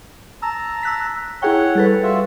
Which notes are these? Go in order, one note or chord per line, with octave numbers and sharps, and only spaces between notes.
A5 A#5 E6
E6 F#6 B6
E4 G#4 C#5 F#5 G5
G3 A4 B4
F4 F#4 E5